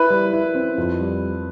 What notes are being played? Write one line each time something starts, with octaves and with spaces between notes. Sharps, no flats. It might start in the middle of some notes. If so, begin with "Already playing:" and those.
Already playing: E4 B4 B5
G3
E4
C4
F2
G3
G3